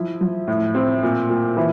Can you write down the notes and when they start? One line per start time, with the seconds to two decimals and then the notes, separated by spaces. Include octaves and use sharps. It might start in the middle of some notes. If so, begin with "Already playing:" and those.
Already playing: F3 E4
0.21 F3
0.47 A2
0.75 C4
1.03 A#2
1.29 A#2
1.57 E3